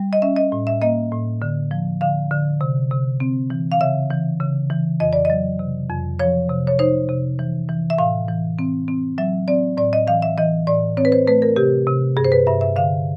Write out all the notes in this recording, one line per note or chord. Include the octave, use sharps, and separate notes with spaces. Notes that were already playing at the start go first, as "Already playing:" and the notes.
Already playing: G3
D#5
C#4 E5
D#5
A2
E5
A#3 D#5
A2
D3
F3
D3 F5
D3
C3
C3
C4
E3
F5
C#3 E5
E3
C#3
E3
F2 D#5
D5
F#3 D#5
C3
F2
F3 C#5
C3
C#5
D#4 C5
C3
E3
E3
E5
A2 F5
E3
C4
C4
F#3 E5
C4 D5
A2 D5
D#5
E3 F5
E5
E3 D#5
A2 D5
C4 C#5
B4
C5
A3 B4
A#4
C3 G4
C3
G2 G#4
C5
B4
G2 E5
E5
D3 F5